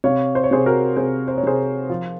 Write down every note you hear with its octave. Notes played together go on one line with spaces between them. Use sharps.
C3 C#5 F5
C5
C#5
C3 G#4 C5
F#4 A#4
C3 G#4 C5
C5
C#5
C3 G#4 C5
F3 F4